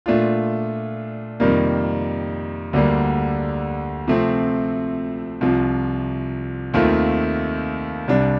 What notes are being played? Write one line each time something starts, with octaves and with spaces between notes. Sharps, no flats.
A#2 A3 D4 F4
F2 C3 D#3 G3 A#3
D2 D3 G3 A#3
C3 F3 A3 C4
C2 C3 F3
D#2 D#3 A3 C4 F4
C2 C3 G3 D4